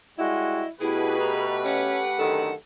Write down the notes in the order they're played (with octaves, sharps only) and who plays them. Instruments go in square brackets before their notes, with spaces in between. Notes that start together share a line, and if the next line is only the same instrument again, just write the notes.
[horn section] G3 G#3 F#4 [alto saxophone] E4 [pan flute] D#5
[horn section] B2 [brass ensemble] A3 G4 B4 [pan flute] E4 [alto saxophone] G#4
[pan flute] A#5
[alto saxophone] C#4 [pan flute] F#5
[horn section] F#2 D3 D#3 [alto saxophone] A4